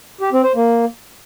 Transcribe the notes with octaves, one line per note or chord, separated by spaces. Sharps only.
G4
C4
C5
A#3